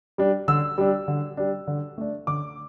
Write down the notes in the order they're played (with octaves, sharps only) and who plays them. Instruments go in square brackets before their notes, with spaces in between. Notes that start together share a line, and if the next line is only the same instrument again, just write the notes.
[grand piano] G3 D4
D3 E6
G3 D4
D3
G3 D4
D3
A3 D4
D3 D6